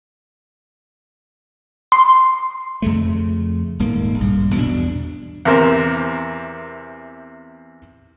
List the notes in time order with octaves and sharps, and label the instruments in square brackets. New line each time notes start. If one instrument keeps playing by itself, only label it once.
[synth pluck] C6
[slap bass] F2 C#3 A3
D#1 G#2 A#3
A#1 G2
E2 B2 A#3 D4
[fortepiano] E2 C3 A#4 C5